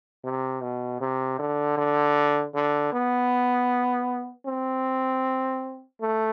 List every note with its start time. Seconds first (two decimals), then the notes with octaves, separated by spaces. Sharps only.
0.24 C3
0.61 B2
1.00 C3
1.39 D3
1.78 D3
2.55 D3
2.93 B3
4.46 C4
6.01 A3